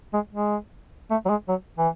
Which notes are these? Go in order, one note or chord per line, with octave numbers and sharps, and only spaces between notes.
G#3
G#3
A3
F#3
G#3
F#3
E3